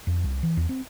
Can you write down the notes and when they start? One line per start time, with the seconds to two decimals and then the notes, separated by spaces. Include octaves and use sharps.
0.07 F2
0.24 C2
0.43 E3
0.57 E2
0.69 C4